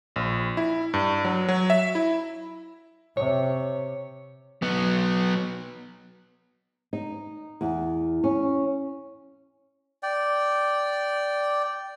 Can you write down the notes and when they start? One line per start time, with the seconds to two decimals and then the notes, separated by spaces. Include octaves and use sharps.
0.16 A#1
0.57 E4
0.94 G2
1.25 F#3
1.48 F#3
1.70 E5
1.95 E4
3.17 C3 C#5
4.62 F#3 B3
6.93 D#4
7.61 E2
8.24 C#4
10.03 D5 G5